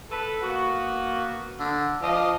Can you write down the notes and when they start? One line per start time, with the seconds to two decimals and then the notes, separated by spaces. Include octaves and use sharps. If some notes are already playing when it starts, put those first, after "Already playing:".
0.10 A4 B4
0.42 A#3 B3 F#4
1.59 D3
2.02 F3 F4 D5 D#5